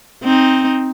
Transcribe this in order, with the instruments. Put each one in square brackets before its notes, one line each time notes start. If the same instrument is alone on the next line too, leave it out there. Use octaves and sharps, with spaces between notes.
[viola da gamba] C4 D#4